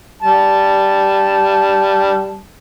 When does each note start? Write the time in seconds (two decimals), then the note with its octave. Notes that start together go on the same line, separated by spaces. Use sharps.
0.22 G3 A5